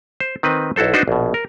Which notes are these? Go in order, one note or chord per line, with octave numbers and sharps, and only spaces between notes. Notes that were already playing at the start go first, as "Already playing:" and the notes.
C5
D#3 C4 B4 D#5
B1 E4 F#4 A4 C5
D4 D#4 F#4 B4 C5
A#1 B2
A#4